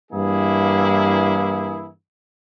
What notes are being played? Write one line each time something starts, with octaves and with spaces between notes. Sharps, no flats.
G2 E3 A#3 E4 G#4